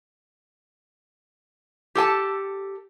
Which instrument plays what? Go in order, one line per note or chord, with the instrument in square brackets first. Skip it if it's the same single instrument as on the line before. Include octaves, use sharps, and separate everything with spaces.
[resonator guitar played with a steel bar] G4 A4 G#5 A5